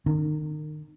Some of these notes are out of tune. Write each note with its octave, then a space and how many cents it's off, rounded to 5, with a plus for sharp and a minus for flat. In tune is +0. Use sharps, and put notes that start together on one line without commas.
D#3 -35 C#4 +0